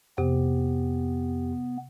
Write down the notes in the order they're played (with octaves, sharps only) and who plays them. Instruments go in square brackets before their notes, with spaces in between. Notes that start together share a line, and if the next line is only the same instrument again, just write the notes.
[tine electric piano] F2 G4 [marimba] C3 [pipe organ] B3